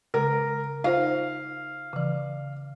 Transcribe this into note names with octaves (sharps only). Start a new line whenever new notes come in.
C#3 G#3 A#4
D#4 F4 C5 F5
C#3 E3